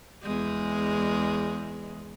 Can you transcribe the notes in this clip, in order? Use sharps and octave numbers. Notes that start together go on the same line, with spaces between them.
E2 G#3